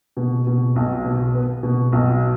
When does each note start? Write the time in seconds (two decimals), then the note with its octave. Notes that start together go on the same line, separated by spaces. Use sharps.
0.17 B2
0.47 B2
0.76 B1
1.04 B2
1.35 B3
1.63 B2
1.92 B1